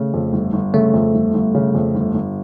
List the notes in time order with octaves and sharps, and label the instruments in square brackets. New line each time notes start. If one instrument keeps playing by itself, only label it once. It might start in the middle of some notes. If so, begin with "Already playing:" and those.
Already playing: [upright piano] C#3 [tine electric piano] A3
[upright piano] F2
G1
G1
[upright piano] C#3 [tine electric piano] A3
[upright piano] F2
G1
G1
C#3
F2
G1
G1